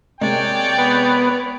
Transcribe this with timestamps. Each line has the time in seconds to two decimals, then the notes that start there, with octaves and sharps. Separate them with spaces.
0.21 C3 G#3 A#3 C#5 D5 G5
0.79 B3